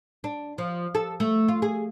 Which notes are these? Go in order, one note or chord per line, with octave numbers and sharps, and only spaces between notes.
D4
F3
A4
A3
F4
G#4